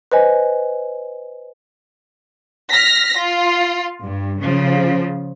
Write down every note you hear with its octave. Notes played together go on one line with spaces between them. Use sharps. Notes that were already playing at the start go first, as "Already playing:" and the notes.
B4 C5 D#5 G#5
F6 A#6 B6
F4
G2
C#3 F3